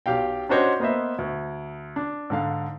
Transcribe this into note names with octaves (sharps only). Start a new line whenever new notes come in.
B1 G4 F5 G5
C#4 D4 F#4 C5 C#5 D#5
A#3 B3 C5 D#5 E5
D2
D4
G#2 D3 F5